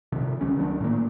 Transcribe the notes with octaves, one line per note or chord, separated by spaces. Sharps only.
C2 C3 D#3 F3
C#2 G3 C#4
D#3 F#3 B3 D4
A2 D3 A#3